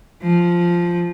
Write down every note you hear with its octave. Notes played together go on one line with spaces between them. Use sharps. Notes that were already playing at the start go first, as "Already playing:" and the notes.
F3